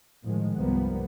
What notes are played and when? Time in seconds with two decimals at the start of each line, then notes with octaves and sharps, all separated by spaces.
0.24 A2 D#3 F3 G#3
0.56 C2 G2 F3 G3 A#3 B3